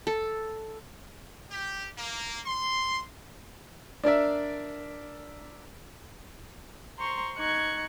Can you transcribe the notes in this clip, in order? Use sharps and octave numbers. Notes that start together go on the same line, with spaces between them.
A4
G4
A#3
C6
D4 A#4 D5 E5
C5 A#5 C6 C#6
D#4 C#6 F#6 G#6